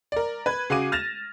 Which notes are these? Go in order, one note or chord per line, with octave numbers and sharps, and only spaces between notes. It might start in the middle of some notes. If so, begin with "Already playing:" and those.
A#4 D5
B4 G#6
C#3 F#4 G#4 F5 D6 D#7
F6 A6 A#6 E7 F7